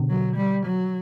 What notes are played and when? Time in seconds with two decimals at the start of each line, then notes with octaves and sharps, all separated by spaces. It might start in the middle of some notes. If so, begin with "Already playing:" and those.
Already playing: B2 D3
0.09 F#3
0.36 G3
0.66 F#3